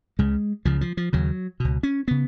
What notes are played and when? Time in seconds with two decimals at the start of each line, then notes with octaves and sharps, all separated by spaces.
0.19 C#2 C#3 G#3
0.65 C#2 C#3 F3
0.81 F3
0.97 F3
1.13 D#2 C#3 F#3
1.60 C#2 B2
1.83 C#4
2.08 C#3 B3